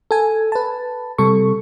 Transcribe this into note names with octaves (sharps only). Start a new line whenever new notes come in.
A4 G#5
B4 A5
C3 G3 A4 C#6